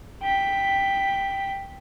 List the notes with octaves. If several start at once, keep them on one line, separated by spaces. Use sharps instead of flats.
G5 B6